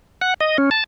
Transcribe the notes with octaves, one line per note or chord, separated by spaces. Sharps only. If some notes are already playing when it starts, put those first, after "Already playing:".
F#5
D#5
C#4
A5